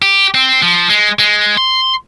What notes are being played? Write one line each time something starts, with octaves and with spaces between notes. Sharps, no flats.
G4
C4
F3
G#3
G#3
C6